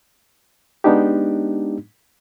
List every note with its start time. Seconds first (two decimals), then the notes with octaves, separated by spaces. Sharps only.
0.84 G#3 B3 D4 D#4 G4